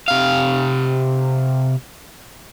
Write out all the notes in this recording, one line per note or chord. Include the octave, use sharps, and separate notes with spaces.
C3 F5